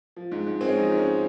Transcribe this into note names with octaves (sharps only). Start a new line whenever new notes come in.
F3
G#2
G#2
G#3 C4
C#4
F3 D#4
G#2
C#4